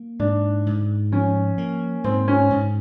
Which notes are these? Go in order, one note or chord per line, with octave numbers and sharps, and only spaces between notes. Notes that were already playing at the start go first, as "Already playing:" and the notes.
Already playing: A#3
G#2 D4
G#2
F3 C#4
A#3
G#2 C4
C#4
G#2